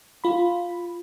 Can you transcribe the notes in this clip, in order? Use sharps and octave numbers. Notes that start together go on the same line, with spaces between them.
F4 B5